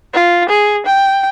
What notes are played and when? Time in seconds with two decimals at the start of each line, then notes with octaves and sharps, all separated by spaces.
0.14 F4
0.49 G#4
0.86 G5